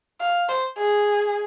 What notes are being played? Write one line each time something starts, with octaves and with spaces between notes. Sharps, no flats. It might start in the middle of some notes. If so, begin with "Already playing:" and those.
F5
C5
G#4